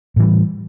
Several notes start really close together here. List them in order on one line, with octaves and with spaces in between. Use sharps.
A2 E3 G3